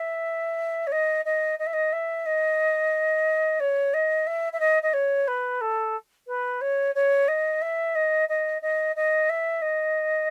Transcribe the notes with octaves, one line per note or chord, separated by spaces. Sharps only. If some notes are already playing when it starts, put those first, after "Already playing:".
Already playing: E5
C#5
D#5
D#5
D#5
E5
D#5
E5
D#5
C#5
D#5
E5
E5
D#5
D#5
C#5
B4
A4
B4
C#5
C#5
D#5
E5
D#5
D#5
D#5
D#5
E5
D#5